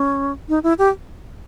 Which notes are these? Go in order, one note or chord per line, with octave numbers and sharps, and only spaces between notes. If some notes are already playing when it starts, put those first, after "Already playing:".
Already playing: C#4
D#4
E4
G4